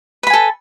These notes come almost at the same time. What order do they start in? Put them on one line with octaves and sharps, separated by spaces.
B4 B5 G#5 A4